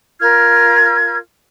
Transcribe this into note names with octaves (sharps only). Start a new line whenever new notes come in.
F4 A#4 F6 G#6